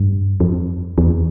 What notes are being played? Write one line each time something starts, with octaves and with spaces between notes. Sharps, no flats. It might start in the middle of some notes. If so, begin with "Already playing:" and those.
Already playing: G2
F2
E2